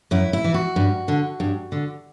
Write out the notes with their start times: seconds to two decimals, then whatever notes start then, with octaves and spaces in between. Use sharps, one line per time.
0.11 F#2 E4
0.33 E4
0.44 E3
0.54 F#4
0.76 G2
1.08 D3
1.40 G2
1.72 D3